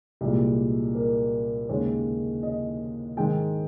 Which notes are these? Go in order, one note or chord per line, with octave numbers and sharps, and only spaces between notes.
C2 A#2 G#3 G4
A#4
D#2 C#3 G#3 C#5
D#5
G#2 D#3 G#3 G5